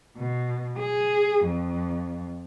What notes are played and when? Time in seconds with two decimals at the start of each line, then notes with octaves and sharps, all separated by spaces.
0.17 B2
0.78 G#4
1.44 F2